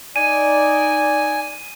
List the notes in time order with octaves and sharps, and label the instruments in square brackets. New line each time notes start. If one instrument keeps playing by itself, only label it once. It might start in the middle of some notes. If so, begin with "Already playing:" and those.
[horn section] D#4 D5 [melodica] G#5 [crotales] D#7